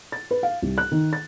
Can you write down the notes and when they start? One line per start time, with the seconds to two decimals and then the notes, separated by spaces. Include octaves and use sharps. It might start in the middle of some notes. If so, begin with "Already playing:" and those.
0.12 A6
0.31 B4
0.43 F5
0.62 C2
0.78 F#6
0.92 D#3
1.13 A6